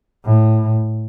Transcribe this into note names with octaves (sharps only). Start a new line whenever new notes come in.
A2